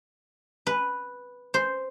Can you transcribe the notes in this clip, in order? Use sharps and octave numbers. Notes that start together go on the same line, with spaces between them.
B4
C5